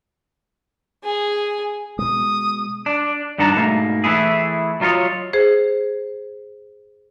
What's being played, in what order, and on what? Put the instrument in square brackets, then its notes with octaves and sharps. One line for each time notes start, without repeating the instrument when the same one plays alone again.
[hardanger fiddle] G#4
[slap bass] B2 G#3 [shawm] D#6
[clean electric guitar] D4
G2 D#3 D4 F#5 A5 A#5
G#2 B2 A3 A#3
E3 A3 E4 G#4
F#3 F4 A#4 C#5 D#5
[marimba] G#4 C5